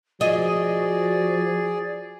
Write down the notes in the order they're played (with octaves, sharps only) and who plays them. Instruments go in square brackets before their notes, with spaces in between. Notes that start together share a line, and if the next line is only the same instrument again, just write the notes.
[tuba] F3 [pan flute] F#4 [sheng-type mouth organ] G#4 D5 [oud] D#5